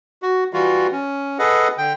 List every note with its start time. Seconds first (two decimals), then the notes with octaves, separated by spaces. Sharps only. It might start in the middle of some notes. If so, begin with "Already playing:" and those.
0.23 F#4
0.53 E3 G3 F4 F#4
0.92 C#4
1.39 G#4 A4 B4 D#5 F#5
1.78 D3 G5